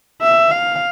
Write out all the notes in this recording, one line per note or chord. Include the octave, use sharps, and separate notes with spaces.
E5
F5